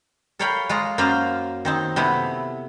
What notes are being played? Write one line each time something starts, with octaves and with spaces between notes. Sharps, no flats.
A4 A#4 C#5 F5 G5 B5
G#3 F4 A#5
F#2 A#3 F4 C5 F5 A#5
D#3 C4 D#4
C3 A3 B3 E4